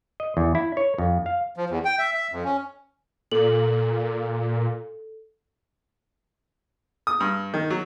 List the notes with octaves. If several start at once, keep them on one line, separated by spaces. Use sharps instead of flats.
D#5
E2
E4
C#5
F2
F5
F3
E2
G5
E5
E5
F2
C#4
A#2 A4 F#7
D#6
G2
D#3
F#3